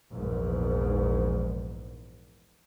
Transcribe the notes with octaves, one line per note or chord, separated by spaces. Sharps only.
A#1 E2 G#2